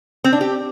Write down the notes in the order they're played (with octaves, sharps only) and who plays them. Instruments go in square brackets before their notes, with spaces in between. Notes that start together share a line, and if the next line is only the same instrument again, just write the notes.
[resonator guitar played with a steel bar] C4
D4
G4